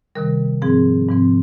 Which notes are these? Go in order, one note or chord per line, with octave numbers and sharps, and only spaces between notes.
C3 D#3 G3 A#4
G#2 F3 C4 G#4
G#2 F3 C4